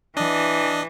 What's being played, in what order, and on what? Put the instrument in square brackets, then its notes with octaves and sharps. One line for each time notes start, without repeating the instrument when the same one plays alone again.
[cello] E3 [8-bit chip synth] D4 D#5